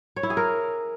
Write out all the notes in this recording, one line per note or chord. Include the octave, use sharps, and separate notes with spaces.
C#5
E4
G#4
A#4